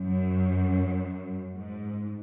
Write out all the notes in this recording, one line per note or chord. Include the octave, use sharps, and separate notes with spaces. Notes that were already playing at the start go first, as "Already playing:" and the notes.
Already playing: F#2
G#2